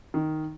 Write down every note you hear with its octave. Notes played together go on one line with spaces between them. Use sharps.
D#3